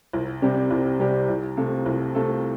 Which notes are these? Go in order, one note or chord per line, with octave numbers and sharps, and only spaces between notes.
C2
C3 G3 C4 G4
C2
C3 G3 C4 G4
C2
C3 A3 F4 A4
C2
C3 A3 F4 A4